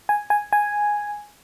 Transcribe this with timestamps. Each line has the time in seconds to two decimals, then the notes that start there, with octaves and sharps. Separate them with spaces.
0.09 G#5
0.30 G#5
0.53 G#5